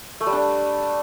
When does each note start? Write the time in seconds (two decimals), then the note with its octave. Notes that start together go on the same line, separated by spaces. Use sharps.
0.21 A3
0.27 G3
0.32 D4